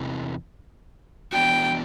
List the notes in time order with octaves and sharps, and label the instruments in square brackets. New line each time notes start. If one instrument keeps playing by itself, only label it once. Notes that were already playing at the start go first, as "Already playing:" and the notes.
Already playing: [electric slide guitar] E2 C3 E3
[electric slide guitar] E3 B3 D4 F#4 [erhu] G5